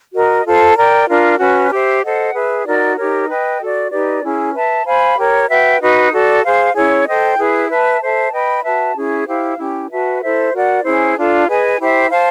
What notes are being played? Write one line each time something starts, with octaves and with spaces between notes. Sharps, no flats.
F#4 A#4 D#5
F4 A4 C5
A#4 D5 G5
D4 F4 A#4
C#4 F#4 B4
G4 C5 E5
A4 C5 D#5 F#5
G#4 B4 E5
D#4 F#4 A#4 D5
D#4 G4 A#4 C#5
B4 D#5 G5
F#4 A4 D5
D#4 G4 B4 D5
C#4 E4 G#4
B4 E5 A5
C5 F5 G#5 B5
G4 A#4 C#5
F#4 B4 E5 G5
D#4 F#4 B4 D#5
F#4 A4 D5
G#4 C5 F5
C#4 E4 G#4 C#5
A4 C5 D#5 G5
E4 G#4 B4
B4 E5 A5
A4 C5 E5 A5
B4 D#5 G5 B5
F#4 B4 E5 A5
C#4 E4 G#4
E4 G4 C5 F5
C#4 E4 G4
F#4 B4 E5 A5
E4 A4 C5 E5
F#4 A#4 D5 F#5
C#4 E4 G#4 C5
D4 F4 A4
G#4 B4 D#5 G#5
E4 G4 C5 E5
C5 F5 A5